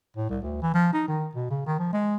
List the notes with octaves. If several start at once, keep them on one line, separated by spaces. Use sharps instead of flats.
A2
C2
D2
E3
F3
D#4
D#3
B2
C#3
D#3
F3
G#3